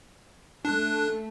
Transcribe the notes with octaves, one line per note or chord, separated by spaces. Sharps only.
A3 D4 F#6